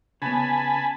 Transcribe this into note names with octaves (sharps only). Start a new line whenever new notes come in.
C#3 B3 G#5 A5 B5